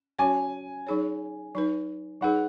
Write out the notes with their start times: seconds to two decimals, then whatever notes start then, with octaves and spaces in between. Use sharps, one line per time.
0.19 F#3 C#4 F#4 C#5 G#5
0.87 F#3 D#4 G#4 C#5
1.55 F#3 D#4 B4
2.21 F#3 D#4 G#4 B4 F#5